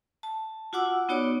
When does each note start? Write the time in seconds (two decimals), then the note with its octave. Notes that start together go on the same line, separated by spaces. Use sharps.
0.23 A5
0.73 F4 F#4 F#5 D6 E6
1.09 B3 D#4 F#4 C#5 D5 D6